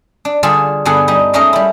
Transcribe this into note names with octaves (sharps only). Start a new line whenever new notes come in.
D4
D3 G3 F4 G#4 A4 A5
G2 D3 B3 G#4 A4 F#5
G3 D#4
G#3 A3 C#4 D#4 A#4 D#5
G3 E4